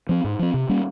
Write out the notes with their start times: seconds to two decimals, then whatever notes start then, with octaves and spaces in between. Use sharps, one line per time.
0.09 F3 C4
0.24 G#2
0.39 F3 C4
0.54 C3
0.69 G3 A#3 C#4